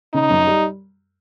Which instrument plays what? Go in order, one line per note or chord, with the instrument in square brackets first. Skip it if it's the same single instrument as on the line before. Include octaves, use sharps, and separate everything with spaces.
[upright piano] C#3 [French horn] D#4
[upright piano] F#2
G3